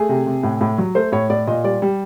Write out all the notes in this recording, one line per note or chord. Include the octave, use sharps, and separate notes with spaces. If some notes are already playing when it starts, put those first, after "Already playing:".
Already playing: A3 G#4
C3
C3
A2
A2
F#3
A3 C5
A2 C#5
A2 D5
A#2 D#5
G3 D5
G3